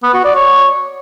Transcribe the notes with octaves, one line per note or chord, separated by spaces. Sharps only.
B3
F#4
D5
C#5